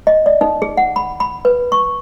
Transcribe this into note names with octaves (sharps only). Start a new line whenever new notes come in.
D#5
D5
D#4
G#4
F#5
B5
B5
B4
C#6